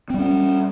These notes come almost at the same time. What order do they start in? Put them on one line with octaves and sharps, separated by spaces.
C4 G3 C#4